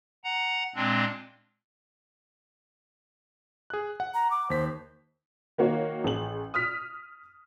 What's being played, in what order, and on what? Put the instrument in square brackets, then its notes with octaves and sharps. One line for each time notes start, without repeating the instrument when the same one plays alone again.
[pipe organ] F#5 A#5
A#2 G#3 C4 D4
[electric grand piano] G#4 F#6
F#5
[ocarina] A#5
D6
[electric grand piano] D#2 B6 [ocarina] C5
[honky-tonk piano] D#3 A#3 F#4 C#5
A1 G#4 F#7
D#6 F6 B6